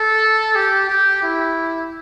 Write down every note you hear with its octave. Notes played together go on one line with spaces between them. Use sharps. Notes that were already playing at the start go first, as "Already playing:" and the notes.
Already playing: A4
G4
G4
E4